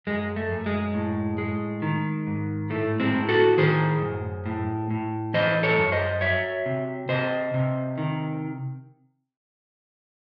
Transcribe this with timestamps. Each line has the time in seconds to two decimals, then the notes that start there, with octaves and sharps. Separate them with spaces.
0.07 F#2 G#3
0.36 A3
0.52 F#2
0.66 G#3
0.94 A2
1.38 G#3
1.82 D#3
2.27 G#2
2.70 A2 A3
3.00 G#3 C4
3.15 A2
3.29 F#4 A4
3.58 D#3 G#4 C5
4.02 F#2
4.46 A2
4.90 A2
5.34 E3 C5 D#5
5.63 A4 C#5
5.78 F#2
5.92 C5 D#5
6.21 F#3 C#5 E5
6.66 C3
7.09 C3 C5 D#5
7.54 C3
7.98 D#3